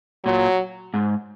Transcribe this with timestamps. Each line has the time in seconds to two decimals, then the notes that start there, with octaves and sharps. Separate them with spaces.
0.25 A#2 F#3
0.94 G#2